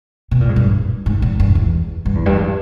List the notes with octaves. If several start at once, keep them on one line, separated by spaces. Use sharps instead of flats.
B2
A#2
G#2
G2
G#2
A#2
G2
E2
G2
E2
G2